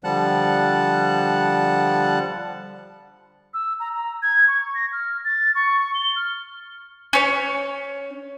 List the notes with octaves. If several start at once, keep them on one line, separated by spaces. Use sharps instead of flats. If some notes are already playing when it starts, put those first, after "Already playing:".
D3 F3 G3 F#5 A5 F#6
E6
A#5
A#5
G#6
C#6
A#6
F6
A6
C#6
G7
F6
C#4 C#5